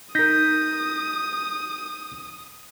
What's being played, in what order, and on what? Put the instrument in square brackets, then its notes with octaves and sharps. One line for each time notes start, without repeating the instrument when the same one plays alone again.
[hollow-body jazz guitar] D#4 A#4 [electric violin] D#6 [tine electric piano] G6 A#6 B6